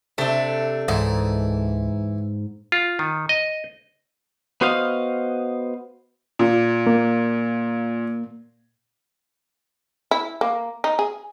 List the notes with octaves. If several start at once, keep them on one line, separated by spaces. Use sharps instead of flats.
C3 A3 D4
C#2 G#2 E3
F4
D#3
D#5
B3 F#4 C5 D#5 F5
A#2
A#3
E4
A#3
D#4
G#4